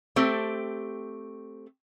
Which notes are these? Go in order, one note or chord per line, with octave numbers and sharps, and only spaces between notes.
A3 C4 G4